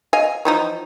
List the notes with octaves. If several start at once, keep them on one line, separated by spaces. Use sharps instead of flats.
D#5 F5 G#5
E3 F3 D#4